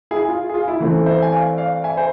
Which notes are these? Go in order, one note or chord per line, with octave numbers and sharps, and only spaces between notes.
E4 G#4
F4
G#4
F4
E4
E3 A3 C4
C5 E5
G#5
D5 F5
D5 F5
E5 G#5
C5 E5